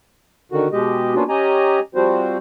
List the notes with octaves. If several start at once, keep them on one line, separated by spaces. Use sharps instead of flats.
D3 D#3 F#4
B2 G#3 G4 D#5
A#3 B3 C#4 D4 F4 F#4
C#4 G4 D#5 G#5 A#5
F3 G3 C4 F#4 C5